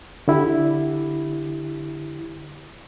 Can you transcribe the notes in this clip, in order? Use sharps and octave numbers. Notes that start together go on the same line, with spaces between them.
D3 E4 G4